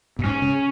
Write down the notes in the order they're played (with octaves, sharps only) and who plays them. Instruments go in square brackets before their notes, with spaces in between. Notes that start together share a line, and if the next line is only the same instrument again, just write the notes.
[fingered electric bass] A#2
[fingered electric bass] G#2 [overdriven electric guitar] C#4
[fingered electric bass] C#3